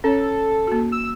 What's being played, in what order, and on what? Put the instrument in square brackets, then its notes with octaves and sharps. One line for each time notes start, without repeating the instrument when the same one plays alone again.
[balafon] C#4 C#5 [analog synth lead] A4
[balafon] A#3 F#4
[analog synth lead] E6